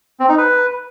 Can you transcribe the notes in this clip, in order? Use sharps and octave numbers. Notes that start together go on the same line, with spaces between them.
C4
D#4
B4